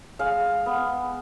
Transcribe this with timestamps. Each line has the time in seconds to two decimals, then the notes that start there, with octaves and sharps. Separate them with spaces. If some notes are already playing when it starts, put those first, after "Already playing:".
0.19 G#3 F5
0.66 B3